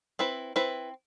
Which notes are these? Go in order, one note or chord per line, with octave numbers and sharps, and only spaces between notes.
C4 E4 B4
C4 E4 B4